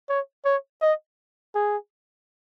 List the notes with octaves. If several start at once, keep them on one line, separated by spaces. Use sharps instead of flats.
C#5
C#5
D#5
G#4